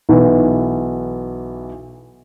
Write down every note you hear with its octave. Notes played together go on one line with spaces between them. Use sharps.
B1 E3 B3